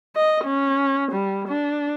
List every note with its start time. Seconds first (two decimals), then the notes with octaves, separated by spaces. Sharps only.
0.16 D#5
0.45 C#4
1.12 G3
1.48 D4